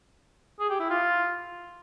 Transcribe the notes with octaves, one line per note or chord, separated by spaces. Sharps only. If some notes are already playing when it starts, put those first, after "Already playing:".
G#4
G4
E4
F4